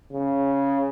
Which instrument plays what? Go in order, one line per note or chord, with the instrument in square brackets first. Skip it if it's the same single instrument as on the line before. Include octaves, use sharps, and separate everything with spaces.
[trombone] C#3